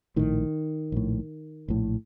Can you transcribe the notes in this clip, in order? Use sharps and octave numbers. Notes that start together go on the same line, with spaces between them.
A#1 A2 D#3
A#1 A2
A#1 A2